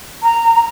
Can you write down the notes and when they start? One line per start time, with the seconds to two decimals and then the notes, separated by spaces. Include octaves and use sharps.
0.23 A#5
0.54 A#5